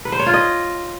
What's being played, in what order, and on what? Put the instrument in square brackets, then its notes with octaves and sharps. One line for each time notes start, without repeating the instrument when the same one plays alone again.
[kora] B4
C5
C#5
F4
D#5